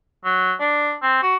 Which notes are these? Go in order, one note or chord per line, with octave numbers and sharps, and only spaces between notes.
F#3
D4
C4
F#4